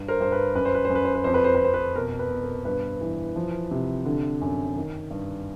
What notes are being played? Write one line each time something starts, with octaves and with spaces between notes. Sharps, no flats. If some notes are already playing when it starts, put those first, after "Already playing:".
Already playing: G2
A#4 C5
G2 C5
B4
F#2 B4
C5
B4
C5
F#2
B4
C5
B4
F2 C5
B4
C5
B4
F2 C5
B4
B2 A#4
B4
B2
A#4
G2 B4
E3
F3
C3
D3
F#2
D#3
G2